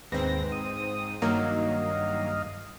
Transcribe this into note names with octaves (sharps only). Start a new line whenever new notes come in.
D#2 G#2 C4 B4 A#6
D#6
G2 D#3 F#3 A#3 D#5 F5